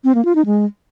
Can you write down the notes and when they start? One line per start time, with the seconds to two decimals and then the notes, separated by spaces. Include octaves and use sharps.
0.04 C4
0.15 A#3
0.25 F4
0.35 D#4
0.46 G#3